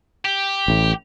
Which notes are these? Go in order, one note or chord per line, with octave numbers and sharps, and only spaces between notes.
G4
A1 A2